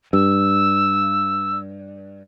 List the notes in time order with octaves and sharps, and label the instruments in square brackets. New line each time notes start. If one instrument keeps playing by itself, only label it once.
[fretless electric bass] G2 [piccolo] E6